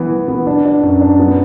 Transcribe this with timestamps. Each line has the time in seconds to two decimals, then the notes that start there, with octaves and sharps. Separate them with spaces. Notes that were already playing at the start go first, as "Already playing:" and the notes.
Already playing: E3 B3
0.10 E3
0.28 B3
0.47 D4
0.65 D4
0.83 F#2
1.01 D4
1.19 B3